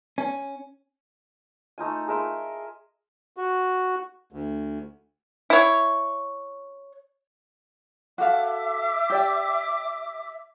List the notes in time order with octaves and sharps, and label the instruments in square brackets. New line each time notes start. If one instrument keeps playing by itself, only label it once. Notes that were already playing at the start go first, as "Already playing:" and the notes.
[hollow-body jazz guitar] C#4
[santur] A3 D#4 F4 G#5
G#4 A#4 E5 C6
[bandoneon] F#4
D2
[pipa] E4 C#5
[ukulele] F#4 A4 F5 [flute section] E5 D6
[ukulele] G4 D5 G5